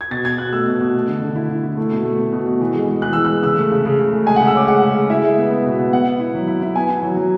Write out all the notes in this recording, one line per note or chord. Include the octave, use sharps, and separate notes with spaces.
G#6
B2 A6
B2 G#6
B2 F#6
A3 E6
B2
B2
A3
D3
D3
E4
E4
E4
A3
B2
A3
B2
B2
B2
E3
G#3
G#3
E3 F#6
E3 E6
G#3 F#6
C#3 E6
A3
C#3
C#3
C#3
A3
G#3 G#5
F#5
C#3
E6
C#4 D6
G#3 F#5
C#3
C#3
E4 E5
G#3
B3
B3
B2
B3
B3 F#5
B3
E4
F#3
E4
E4
B3 G#5
E4
F#3
F#3